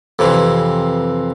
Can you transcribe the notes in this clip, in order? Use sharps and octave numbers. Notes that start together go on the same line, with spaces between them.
F2 C3 E3